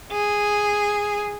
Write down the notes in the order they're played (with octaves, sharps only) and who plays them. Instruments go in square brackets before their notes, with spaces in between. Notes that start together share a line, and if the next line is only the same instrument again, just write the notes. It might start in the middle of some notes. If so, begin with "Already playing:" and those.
[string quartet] G#4